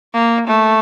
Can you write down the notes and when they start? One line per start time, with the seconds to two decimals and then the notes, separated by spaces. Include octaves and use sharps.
0.14 A#3
0.47 A3